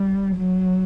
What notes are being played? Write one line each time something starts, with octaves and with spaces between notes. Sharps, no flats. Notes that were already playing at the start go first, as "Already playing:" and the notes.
Already playing: G3
F#3